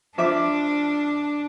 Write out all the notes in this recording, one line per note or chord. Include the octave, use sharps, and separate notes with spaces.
F3 D4 E5 D6